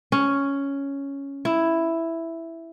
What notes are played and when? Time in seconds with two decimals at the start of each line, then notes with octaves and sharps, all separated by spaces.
0.12 C#4
1.45 E4